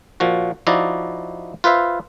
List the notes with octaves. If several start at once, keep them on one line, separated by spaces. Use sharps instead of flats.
A#2 F3 F#4
F3 D#4 E4 F#4 D5 D#5
F4 B4 C5 E5 F5